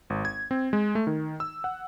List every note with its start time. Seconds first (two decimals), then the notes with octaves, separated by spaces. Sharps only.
0.10 G#1
0.25 G#6
0.51 C4
0.73 G#3
0.95 A3
1.07 D#3
1.40 E6
1.64 F#5